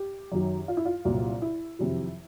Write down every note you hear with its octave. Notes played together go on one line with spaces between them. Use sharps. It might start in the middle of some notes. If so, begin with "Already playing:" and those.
Already playing: G4
F#2 D#3 F#3
F4
E4
F4
C2 A#2 F#3
E4
F2 C3 D#3 F#3